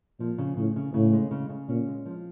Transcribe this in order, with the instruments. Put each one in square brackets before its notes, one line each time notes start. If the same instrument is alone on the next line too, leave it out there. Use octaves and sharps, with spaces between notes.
[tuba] A#2 [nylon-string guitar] F3
[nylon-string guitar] C#3
[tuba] A2 [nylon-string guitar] C#3
[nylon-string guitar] C#3
[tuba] A2 [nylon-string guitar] C#3
[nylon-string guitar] G#3
C#3
C#3
[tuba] A#2 [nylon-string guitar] C#4
[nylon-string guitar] G#3
F3